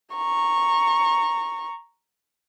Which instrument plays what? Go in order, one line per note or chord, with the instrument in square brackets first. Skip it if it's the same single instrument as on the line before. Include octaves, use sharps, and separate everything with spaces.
[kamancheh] A#5 C#6